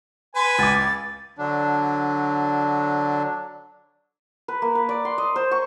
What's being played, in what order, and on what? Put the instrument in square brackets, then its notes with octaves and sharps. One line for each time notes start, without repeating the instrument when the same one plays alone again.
[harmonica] B4 G#5 [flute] C6
[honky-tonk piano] C#2 D6 [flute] A6
[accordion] D3 F#3 D4
[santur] B4
A#3
B4
D5
C6
D#5
C5
C#6